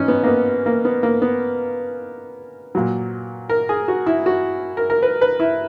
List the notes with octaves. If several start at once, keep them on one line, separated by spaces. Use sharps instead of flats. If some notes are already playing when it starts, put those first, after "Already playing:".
Already playing: G#2 E3 C#4 D#4
B3
A#3
B3
A#3
B3
A#3
B3
A#2 F#3
A#4
G#4
F#4
E4
F#4
A#4
A#4
B4
B4
E4